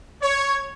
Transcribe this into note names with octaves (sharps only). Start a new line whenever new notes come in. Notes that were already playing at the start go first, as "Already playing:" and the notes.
C#5